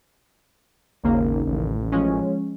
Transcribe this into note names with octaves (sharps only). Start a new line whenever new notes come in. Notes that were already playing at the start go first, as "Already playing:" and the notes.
G#1 D#2 C#3 A#3
A1
F3 G#3 C#4